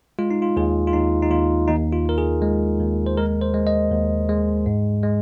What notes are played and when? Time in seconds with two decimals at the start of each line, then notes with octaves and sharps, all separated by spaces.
0.19 G#3 F4
0.31 D#4
0.42 F4
0.57 D#2 G#4
0.87 F4
0.93 D#2 D#4
1.22 D#4
1.30 D#2 F4
1.68 D#2 D#4
1.93 F4
2.06 D#2 A#4
2.18 G#4
2.42 G#3
2.81 D#2
3.06 C5
3.17 G#3 A#4
3.41 C5
3.54 G#3
3.67 D#5
3.91 D#2
4.29 G#3
4.66 G#2
5.03 G#3